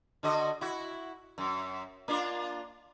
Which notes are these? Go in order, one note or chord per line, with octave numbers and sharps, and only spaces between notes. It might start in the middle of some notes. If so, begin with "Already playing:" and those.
D3 F#4 D#5
E4 F#4
F#2
A#3 D4 F4